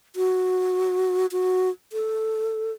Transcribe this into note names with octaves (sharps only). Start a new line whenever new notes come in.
F#4
F#4
A4